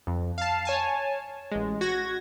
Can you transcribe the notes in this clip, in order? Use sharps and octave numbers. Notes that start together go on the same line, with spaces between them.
F2
F5 A5
C#5 G#5 A5
A1 G#3
F#4 G#6 A#6